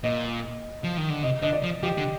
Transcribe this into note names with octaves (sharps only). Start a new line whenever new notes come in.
A#2 D#5
F3
D#3
D3
C3 D#5
D3 D#5
D5
F3
F3 G4
D3